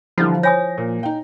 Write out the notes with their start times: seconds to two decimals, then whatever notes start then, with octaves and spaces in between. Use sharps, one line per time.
0.18 D3 E3 F3 G3 E4
0.43 C#5 G#5 D#6 A#6
0.78 A#2
1.03 D#4 G5